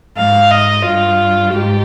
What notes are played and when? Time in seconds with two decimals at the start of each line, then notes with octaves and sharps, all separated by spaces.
0.17 G#2 F5
0.51 D#5
0.86 G2 F4
1.54 G#2 G4